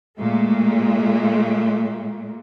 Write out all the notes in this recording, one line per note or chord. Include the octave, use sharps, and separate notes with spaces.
A#2 G#3 A3